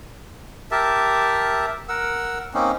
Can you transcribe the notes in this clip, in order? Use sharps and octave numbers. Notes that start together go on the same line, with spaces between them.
G4 A#4 E5 A5
A#4 F#5 E6
A#3 C4 C#4 D#4